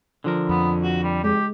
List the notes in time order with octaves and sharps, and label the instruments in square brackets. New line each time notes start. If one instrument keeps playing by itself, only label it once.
[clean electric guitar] D3 F3 A#4
[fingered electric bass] F2 [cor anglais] B3
[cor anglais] F#4
G3
[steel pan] G#3 [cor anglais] G4